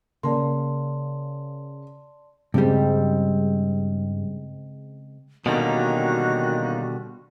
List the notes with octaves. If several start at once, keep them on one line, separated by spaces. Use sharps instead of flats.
C#3 A#3 D5 A5 C6
G2 C#3 G3 G#3 C4
B2 D3 D#3 G3 A#3 C#4 D#4 F#4